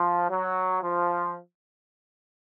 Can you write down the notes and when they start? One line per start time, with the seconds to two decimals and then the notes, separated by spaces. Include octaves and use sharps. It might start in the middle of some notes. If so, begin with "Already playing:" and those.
Already playing: F3
0.30 F#3
0.82 F3